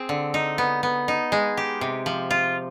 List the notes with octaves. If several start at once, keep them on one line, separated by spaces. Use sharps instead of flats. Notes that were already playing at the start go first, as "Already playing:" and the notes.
Already playing: C4 G#4
D3
D#4
B3
B3
D#4
G#3
G4
C3
F3
F4